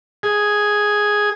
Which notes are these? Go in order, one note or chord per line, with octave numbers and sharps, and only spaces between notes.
G#4